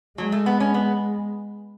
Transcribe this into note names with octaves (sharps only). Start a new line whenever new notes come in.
F#3 G#3
A3
B3
C#4
B3